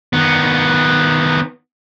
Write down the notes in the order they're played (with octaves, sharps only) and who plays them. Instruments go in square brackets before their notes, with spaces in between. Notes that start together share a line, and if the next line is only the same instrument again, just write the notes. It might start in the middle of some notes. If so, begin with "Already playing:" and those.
[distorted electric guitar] D#3 B3